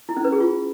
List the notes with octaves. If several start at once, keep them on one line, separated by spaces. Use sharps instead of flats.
E4
C#4
B4
G#4
F4